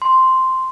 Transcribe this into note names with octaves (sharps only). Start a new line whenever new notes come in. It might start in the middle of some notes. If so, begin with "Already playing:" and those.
C6